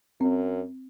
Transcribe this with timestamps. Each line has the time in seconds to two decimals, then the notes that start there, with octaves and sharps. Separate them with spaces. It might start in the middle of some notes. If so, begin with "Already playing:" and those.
0.21 F#2 C4